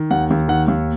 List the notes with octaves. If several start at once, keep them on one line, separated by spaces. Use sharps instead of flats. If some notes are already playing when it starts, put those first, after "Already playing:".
Already playing: D#3
D#2 F#5
D#2
D#3 F#5
D#2